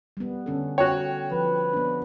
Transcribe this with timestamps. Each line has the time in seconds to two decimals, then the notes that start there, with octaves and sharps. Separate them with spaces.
0.17 G3 B3
0.46 D3 C#4 A4
0.78 F#4 C#5 G5
1.32 F3 B4
1.73 B3 D4